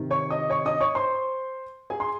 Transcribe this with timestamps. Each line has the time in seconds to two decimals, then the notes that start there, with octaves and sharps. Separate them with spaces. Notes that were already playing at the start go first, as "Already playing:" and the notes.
Already playing: C3 D#3
0.11 C#5 C#6
0.30 D#5 D#6
0.50 C#5 C#6
0.65 D#5 D#6
0.81 C#5 C#6
0.95 C5 C6
1.90 G#4 G#5
2.00 C6